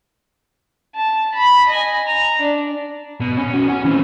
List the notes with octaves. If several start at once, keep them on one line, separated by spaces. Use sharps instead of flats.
A5
B5
D#5 G#5
A#5
D4
B2
C#4
B1 F#4
C#4
E3 C4